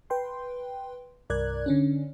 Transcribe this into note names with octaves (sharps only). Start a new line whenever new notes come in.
B4 G5 C6
C2 G2 A#4 D5 F#6 G#6
D3 C#4 D4